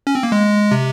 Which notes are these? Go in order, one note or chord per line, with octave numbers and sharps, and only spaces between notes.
C#4
C4
A#3
G#3
C3